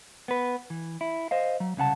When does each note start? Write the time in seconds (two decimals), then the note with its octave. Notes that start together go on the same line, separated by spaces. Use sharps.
0.28 B3 B4
0.70 E3
1.01 E4
1.31 C5 D#5 F5
1.60 F#3
1.77 C2 C#3 F#5 A5